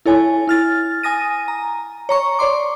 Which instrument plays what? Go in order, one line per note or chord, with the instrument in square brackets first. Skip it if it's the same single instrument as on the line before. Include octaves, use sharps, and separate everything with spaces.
[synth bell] E4 A4 C#5 G#5
E4 F6 A6
G#5 D#6 A#6 D#7
A#5
C#5 A#5 C#6
C#5 D5 C6 D6